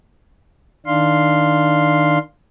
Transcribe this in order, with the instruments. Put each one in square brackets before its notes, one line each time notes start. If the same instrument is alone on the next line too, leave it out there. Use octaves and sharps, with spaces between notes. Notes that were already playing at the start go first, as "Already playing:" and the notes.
[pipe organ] D#3 D4 F5 C6